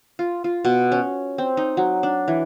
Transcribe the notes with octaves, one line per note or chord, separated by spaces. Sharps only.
F4
F4
B2
C#4
C4
D#4
F#3
D4
E3